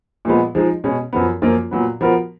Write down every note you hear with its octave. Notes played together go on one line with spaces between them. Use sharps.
A#2 F3 G#3 B3
F3 G#3 D#4
B2 G#3 C#4
F#2 F3 B3
F#2 F3 A#3 F4
A#2 F#3 B3
F3 B3 F#4 A#4